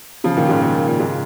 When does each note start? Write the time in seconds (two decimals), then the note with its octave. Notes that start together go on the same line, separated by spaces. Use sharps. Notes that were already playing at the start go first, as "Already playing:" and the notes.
0.24 C#3 F3
0.36 A#2 D#3
0.49 G#2 C#3
0.61 A#2
0.87 A#2
0.99 G#2 C#3